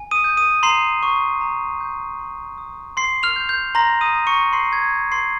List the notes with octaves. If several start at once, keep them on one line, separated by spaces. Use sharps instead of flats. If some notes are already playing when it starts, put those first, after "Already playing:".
Already playing: G#5
D#6 D#7
G6
D#6 D#7
A#5 C6 C7
C#6
A#5
G6
C6
D#6
C6 C7
F6 F7
G6
G6
A#5 C6 A#6
D#6 D#7
D#6
C#6 C#7
C6 C7
G#6
G6
C6 C7